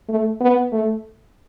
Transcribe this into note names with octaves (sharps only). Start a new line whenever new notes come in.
A3
B3
A3